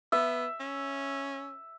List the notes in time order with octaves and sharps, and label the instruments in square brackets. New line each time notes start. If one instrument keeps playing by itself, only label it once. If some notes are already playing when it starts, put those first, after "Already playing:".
[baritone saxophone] B3 [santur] E5
[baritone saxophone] C#4